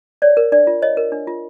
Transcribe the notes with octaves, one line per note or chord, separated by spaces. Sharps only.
C#5 D5
A#4
D4 D5
F4
C#5 D#5
A#4
D4
F4